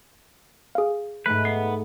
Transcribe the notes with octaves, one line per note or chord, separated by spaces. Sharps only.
G#4 F5
G#2 A3 B4
B3 C7